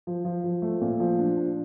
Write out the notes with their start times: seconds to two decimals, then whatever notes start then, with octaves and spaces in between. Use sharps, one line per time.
0.07 F3
0.25 F3
0.44 F3
0.62 A3
0.81 A#2
1.00 F3
1.19 D4
1.37 D4